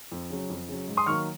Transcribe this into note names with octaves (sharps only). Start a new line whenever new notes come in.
F2
C#3 F#3
F2
C#3 F#3
G#2
C6 D#6
D#3 F#3 A#3 C#6 F6